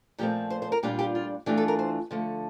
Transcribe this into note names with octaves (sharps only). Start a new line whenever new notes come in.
A#2 F3 A3 C4 G4
C5
C5
A#4
A#2 G3 D4 F4 G4
G4
F4
E3 A3 D4 F4 G4
A4
A#4
C5
D3 F3 A3